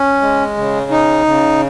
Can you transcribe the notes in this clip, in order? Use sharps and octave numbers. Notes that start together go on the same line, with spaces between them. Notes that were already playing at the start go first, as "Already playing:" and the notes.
Already playing: C#4
G#3
C#3
D#4
C#3